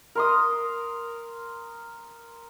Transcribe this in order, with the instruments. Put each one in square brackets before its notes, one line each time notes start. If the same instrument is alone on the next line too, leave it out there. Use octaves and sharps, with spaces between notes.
[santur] A#4 C6 D#6